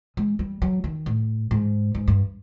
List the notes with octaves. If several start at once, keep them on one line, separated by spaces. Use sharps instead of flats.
G#3
G3
F#3
D#3
A2
G#2
G#2
G2